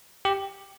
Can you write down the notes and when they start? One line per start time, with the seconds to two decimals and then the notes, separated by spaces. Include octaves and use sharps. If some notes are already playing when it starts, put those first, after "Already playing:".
0.25 G4